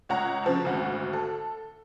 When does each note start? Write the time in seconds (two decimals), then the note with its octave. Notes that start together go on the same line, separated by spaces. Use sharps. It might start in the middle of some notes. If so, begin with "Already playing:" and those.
0.09 C#2 C#5 F#5 A#5 F#6
0.44 C#3 F3 A5
0.65 G#1 D2 F#4
1.13 A4